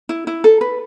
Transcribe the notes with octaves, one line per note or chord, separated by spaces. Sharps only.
E4
E4
A4
B4